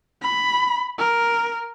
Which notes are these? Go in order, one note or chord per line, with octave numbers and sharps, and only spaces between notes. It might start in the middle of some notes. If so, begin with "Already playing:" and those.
B5
A#4